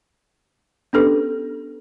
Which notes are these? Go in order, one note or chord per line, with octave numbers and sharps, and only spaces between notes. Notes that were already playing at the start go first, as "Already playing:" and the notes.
B3 C#4 D4 G4 A4 B4